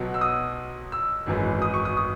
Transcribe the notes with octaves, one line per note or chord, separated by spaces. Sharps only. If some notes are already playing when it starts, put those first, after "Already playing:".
Already playing: B1 B2 F#3
E6
D#6
E6
G#1 F#2 E3 G#3
D#6
C#6
D#6
D#6